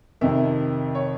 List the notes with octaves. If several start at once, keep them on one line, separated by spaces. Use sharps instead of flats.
F2 C3 D#3 E5
C#5